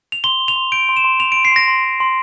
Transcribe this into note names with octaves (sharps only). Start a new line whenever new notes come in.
F7
C6 G7
C6
F7
C6
G6 D7
C6
E7
C6
C6 F7
D7
C6
C7
C6 A#6
C6
C6
C6